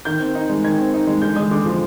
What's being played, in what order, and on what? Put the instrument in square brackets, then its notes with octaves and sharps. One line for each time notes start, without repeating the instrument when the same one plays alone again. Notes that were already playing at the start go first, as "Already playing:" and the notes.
[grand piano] D#3 G6
C4
D#4
G#3
D#3 G#6
C4
D#4
G#3
D3 G6
G#3 D#6
D3 D6
F3 C6